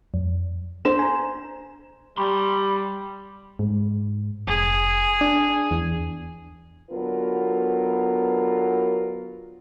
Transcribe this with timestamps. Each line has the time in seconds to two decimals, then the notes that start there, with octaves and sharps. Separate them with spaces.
0.14 F2
0.85 D4 C5 E7
0.99 G#5 A#5
2.17 G3 B5 C6
3.59 G#2
4.47 F1 G#4
5.21 D4
5.71 E2
6.90 D3 F#3 B3 F4 A#4 B4